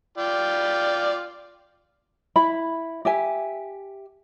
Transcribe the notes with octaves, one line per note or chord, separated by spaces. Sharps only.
F4 D5 G5
E4 B5
G4 E5 G#5